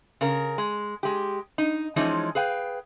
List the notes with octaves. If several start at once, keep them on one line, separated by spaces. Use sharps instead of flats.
C#3 A#4
G#3
G#3 G4
D#4
E3 F3 G#3 C#4 D#4
G#4 B4 F5 G5